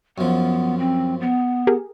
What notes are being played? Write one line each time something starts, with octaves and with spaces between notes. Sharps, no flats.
F#2 F3 B3
C4
B3
G4 G#4 A#4